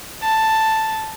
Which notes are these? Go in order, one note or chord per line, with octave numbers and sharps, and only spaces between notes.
A5